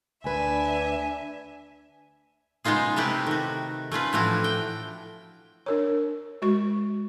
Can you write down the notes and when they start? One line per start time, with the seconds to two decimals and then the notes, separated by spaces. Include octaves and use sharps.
0.24 D2 D4 B4 E5 G#5
2.64 C#3 G#3 B3 D#4 F4 G#4
2.96 C3 A3 E4 G4 B4
3.27 D#3 F#4
3.92 A3 C#4 F4 B4
4.13 A2 E3 F3 D4 E4 F#4
4.44 G5
5.66 D4 A#4 C#5
6.42 G#3 F#4 C#6